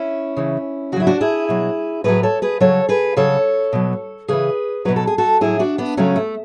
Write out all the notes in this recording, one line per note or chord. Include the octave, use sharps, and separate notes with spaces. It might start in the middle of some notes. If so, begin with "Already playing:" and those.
Already playing: C#4 E4
C#3 E3
C#3 F#3 E4 F#4
D4 F#4
E4 G#4
B2 F#3
A2 F#3 G#4 B4
A4 C#5
G#4 B4
C#3 F#3 A4 C#5
G#4 B4
C#3 F#3 A4 C#5
B2 F#3
C#3 E3 G#4 B4
B2 F#3 B4
A4
G#4
F#4 A4
A2 F#3 E4 G#4
D4 F#4
B3 D4
C#3 F#3 A3 C#4
A3